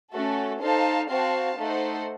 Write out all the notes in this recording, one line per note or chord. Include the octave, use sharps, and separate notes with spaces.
A3 C#4 F#4 A4
D#4 A4 C5 F5 A5
C4 F#4 C5 F5 A5
A3 D#4 A4 C5 F#5